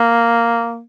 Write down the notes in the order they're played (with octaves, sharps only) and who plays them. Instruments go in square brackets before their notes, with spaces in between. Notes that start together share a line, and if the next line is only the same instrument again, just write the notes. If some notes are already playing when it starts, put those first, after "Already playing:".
Already playing: [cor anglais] A#3